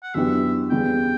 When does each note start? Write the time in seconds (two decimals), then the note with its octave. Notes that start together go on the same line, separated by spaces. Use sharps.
0.03 F#5
0.15 F#2 E3 B3 D4 G4 E5
0.70 E2 C#3 G3 B3 G5